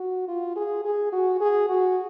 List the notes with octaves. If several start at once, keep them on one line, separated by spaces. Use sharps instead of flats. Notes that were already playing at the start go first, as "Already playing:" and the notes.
Already playing: F#4
F4
G#4
G#4
F#4
G#4
F#4